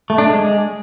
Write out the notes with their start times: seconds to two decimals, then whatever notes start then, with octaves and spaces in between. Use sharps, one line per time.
0.10 A3
0.18 D4
0.27 G#3